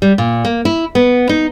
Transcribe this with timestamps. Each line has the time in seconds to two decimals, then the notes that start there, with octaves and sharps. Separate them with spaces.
0.02 G3
0.18 A#2
0.45 A#3
0.65 E4
0.95 B3
1.29 D#4